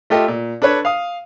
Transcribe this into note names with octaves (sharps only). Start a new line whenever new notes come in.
A3 F4 G4 A4 D#5
A#2
D4 A4 B4 C#5
F5 D#6